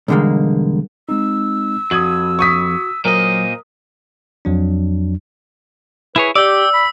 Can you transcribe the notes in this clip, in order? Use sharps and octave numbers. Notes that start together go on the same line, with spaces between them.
B1 E2 D3 G3 G#3 A#3
G#3 C4 D#4 E6
F2 F#4 D#6 G#6 F#7
C#6 D#6 B6
A#2 F#3 A#4 C5 D#5
F2 F#3 D4
E4 G#4 B4 C#5
G4 D5 G5 D6 E6
B5